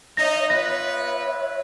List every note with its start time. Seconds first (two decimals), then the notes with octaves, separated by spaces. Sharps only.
0.17 D#4 C#5 E5 A#6
0.50 B3 F4 B4 A#6